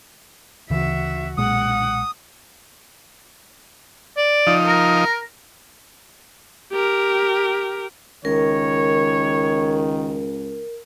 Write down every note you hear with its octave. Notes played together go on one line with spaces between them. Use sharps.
D2 C#3 E3 F#4 E5
B1 A#2 G#3 F#5 D#6
D5
F3 D#4
A#4
G4 A#4
C#2 D#3 A#4 C#5